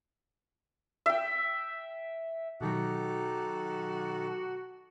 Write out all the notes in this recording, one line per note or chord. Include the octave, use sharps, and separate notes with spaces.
E5 G5
B2 D#3 F#3 D#4 F#4 G4 A4